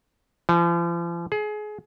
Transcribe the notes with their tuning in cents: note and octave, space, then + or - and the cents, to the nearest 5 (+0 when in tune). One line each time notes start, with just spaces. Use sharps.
F3 -40
G#4 +25